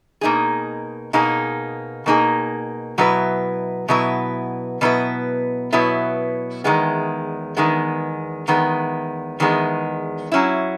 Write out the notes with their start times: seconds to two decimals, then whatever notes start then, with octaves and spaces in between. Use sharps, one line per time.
0.21 B2 A#3 D#4 G#4
1.13 B2 A#3 D#4 G#4
2.06 B2 A#3 D#4 G#4
2.98 B2 F#3 B3 E4 B4
3.88 B2 F#3 B3 E4 B4
4.81 B2 F#3 B3 E4 B4
5.72 B2 F#3 B3 E4 B4
6.64 E2 D#3 G#3 B3
7.56 E2 D#3 G#3 B3
8.48 E2 D#3 G#3 B3
9.40 E2 D#3 G#3 B3
10.32 F#3 C#4 E4